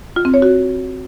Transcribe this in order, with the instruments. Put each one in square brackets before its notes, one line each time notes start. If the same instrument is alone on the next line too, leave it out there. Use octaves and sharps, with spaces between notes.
[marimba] F4
C4
C#5
F#4